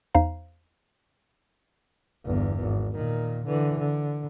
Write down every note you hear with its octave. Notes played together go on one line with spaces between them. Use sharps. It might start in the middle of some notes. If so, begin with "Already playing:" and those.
E2 D#4 C5 F5 A#5
G1 E2
G#1
A#2 D#3
D3 E3
D3